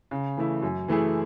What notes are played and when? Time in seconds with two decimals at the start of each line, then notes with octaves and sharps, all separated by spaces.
0.11 C#3
0.37 E3 A3 E4
0.63 F#2
0.88 E3 A3 E4 G#4